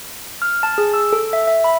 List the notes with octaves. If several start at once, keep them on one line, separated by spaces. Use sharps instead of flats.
F6
A5
G#4
E6
A4
E5
E5
B5